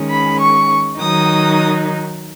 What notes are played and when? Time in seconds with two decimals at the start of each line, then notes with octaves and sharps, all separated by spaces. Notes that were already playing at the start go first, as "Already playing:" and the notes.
Already playing: D#3 G#3 C#4
0.09 B5
0.39 C#6
0.99 D#3 F#3 D#4 D#6